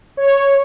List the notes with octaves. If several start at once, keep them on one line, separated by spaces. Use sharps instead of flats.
C#5